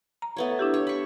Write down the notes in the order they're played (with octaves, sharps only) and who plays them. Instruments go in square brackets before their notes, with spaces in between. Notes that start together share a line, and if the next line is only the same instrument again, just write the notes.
[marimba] A#5
[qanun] A3 B3 C#5
[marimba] D4 E4 G4
[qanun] C#5
B5 C#6